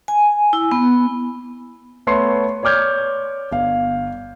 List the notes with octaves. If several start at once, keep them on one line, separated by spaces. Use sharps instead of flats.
G#5
E4
B3
A3 B3 C#5 C6 C7 C#7
C#5 D5 D6 F6 G6 G#6
G1 F5